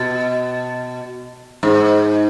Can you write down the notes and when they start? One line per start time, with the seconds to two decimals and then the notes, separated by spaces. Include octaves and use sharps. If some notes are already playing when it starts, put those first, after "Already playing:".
Already playing: B2
1.63 G#2